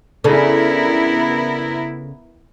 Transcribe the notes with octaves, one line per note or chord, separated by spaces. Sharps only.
C#3 B3 D4 E4 A4 A#4